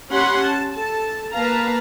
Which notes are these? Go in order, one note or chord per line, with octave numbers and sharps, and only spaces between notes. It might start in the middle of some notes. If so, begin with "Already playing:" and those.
C#4 G4 C#5 F#5 B5 C6
A5
A4 A5
A#3 B4 F5 A5 A#5